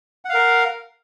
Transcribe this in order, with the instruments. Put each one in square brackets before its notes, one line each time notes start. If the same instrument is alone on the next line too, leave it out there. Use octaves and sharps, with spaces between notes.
[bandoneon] F#5
F5
A#4